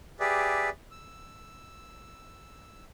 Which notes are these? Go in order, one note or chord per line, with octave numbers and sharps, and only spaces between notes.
G4 G#4 B4 D5 E5
E6